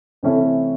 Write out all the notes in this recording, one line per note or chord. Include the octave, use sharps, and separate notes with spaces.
C3 E3 A3 C#4 E4